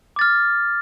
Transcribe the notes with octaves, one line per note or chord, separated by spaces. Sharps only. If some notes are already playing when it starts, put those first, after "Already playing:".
D6 F6 A6